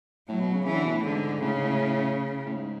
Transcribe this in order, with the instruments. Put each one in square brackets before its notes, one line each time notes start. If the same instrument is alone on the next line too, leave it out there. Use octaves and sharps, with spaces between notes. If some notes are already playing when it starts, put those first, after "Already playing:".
[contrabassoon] A2 [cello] F#3
[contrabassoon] B2
C#3
[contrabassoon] C#3 [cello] E3
[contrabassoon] D3
B2
A2
[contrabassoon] G#2 [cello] D3
[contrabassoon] A2 [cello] C#3
[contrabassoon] G#2
A2
A2
G#2